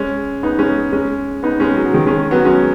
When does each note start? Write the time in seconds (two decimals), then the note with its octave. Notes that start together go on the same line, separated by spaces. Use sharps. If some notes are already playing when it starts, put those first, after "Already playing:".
Already playing: G#3 C#4
0.43 B3 D#4
0.59 G#3 C#4
0.92 G#3 C#4
1.43 B3 D#4
1.60 G#3 C#4
1.77 F#3
1.94 D#3 G#3
2.06 G#3 C#4
2.31 F#3 B3
2.44 G#3 C#4